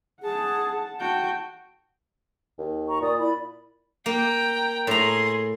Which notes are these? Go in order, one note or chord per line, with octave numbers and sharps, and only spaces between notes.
G#4 F#5 A5
F#4 G5 A5
D#2
A#5 C#6
A#2 D5 D#6
E4 D5 B5
A#3 G5 A#5
A2 G#4 A#5 C6